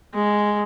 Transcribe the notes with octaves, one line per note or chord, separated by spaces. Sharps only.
G#3